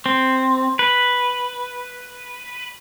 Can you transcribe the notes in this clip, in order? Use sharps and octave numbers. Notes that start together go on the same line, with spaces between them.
C4
B4